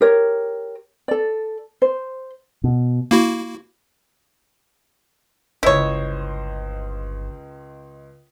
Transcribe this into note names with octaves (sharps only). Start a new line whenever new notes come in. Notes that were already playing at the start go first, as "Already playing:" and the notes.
G4 A#4 C#5
A4 D5
C5
B2
A#3 E4 F#4
G1 C#2 E4 C5 C#5 D#5